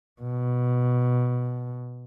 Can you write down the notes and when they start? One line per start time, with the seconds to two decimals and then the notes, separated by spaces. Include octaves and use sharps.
0.22 B2